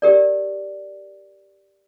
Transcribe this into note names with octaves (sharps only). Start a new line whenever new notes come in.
G4 A#4 D5